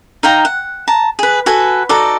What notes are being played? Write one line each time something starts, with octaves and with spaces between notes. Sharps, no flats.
D#4 F5 G5 A#5
F#5
A5 A#5
G#4 B4
F#4 A4 B4 G#5
D#4 F#4 A4 D5